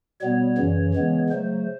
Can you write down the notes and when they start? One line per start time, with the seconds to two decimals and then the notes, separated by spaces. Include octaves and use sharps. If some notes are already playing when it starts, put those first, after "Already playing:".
0.21 B2 G3 B3 C#5
0.58 F#2 C#3 E3
0.94 C#3 E3 G#3 B3
1.30 C#3 F#3 A3 C5